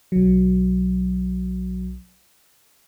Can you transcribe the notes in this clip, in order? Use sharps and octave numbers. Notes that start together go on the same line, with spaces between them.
B1 F#3